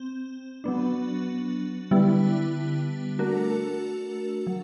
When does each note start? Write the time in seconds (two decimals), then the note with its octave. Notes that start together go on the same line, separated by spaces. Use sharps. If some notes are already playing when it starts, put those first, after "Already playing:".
Already playing: C4
0.64 F#3 B3 D4
1.91 D3 G3 B3 E4
3.19 A3 D4 F#4 A#4
4.47 F#3